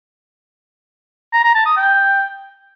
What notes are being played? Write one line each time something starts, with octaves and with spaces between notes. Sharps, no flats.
A#5
A#5
A5
D#6
G5